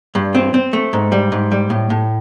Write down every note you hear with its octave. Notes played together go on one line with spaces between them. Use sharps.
G2
C4
C4
A3
G#2
G3
G#2
G3
A2
A2